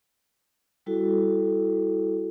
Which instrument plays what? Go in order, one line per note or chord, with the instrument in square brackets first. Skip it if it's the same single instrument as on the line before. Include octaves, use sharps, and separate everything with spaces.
[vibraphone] G3 E4 F#4 A4